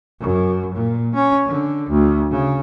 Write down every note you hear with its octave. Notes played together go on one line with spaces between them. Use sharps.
F#2
A#2
C#4
D3
D2
C#3